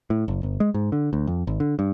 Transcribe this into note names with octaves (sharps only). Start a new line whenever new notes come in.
A2
F#1
G1
G#3
G#2
D3
D2
F2
G#1
D3
G2